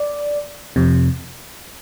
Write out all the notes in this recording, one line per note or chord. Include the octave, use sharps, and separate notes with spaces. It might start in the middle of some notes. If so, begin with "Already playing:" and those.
Already playing: D5
F2 C3